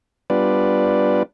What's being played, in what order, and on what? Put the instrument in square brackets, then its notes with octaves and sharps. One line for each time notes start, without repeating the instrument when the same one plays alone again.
[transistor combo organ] G3 B3 D4 F4 B4 D5